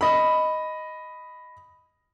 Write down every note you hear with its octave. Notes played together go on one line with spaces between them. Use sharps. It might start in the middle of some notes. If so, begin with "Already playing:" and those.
D#5 B5